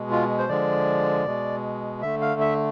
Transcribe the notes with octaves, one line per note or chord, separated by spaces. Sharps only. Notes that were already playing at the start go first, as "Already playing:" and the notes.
Already playing: B2 G#3
F4
C5
D3 F3 G#3 D5
B2 G#3
D3 A3 E5
F5
E5